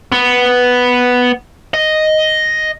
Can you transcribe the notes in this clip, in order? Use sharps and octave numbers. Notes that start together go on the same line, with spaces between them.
B3
D#5